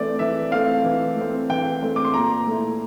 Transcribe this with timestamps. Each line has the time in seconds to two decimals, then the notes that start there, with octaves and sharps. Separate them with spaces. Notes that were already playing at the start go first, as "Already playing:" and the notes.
Already playing: E3 A3 C4 D5
0.19 E3 E5
0.51 A3 C4 F5
0.84 E3
1.16 A3
1.21 C4
1.49 E3 G5
1.82 A3 C4
1.96 D6
2.05 C6
2.14 A#2 A#5
2.46 A3 E4